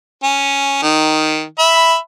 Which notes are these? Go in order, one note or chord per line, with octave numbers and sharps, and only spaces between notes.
C#4
D#3
E5 B5